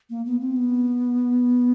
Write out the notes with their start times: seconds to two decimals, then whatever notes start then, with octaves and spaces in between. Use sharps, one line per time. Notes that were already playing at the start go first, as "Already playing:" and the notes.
0.10 A#3
0.26 B3
0.40 C4
0.56 B3